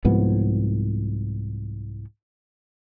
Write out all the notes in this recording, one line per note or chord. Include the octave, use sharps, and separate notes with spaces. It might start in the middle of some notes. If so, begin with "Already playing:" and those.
C2 G#2 F3 B3